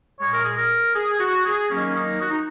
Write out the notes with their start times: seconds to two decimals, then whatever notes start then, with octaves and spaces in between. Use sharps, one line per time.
0.20 A#2 G#3 C#5
0.33 A#4
0.45 G#4
0.57 A#4
0.96 G#4
1.20 F#4
1.45 G#4
1.71 D#3 F#3 A#3 C#4
1.97 D#4
2.21 F#4
2.30 D#4